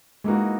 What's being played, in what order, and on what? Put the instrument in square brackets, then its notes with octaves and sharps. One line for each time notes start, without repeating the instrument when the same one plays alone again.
[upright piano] E3 A#3 D#4 F#4 [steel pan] G#3